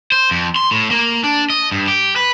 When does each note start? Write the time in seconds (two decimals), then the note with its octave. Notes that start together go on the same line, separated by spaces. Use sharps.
0.12 C5
0.31 F2
0.56 C6
0.71 A2
0.91 A#3
1.24 D4
1.50 D#5
1.72 G2
1.88 G4
2.16 B4